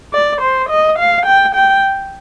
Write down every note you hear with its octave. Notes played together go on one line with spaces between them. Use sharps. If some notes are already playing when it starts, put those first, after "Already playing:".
D5
C5
D#5
F5
G5
G5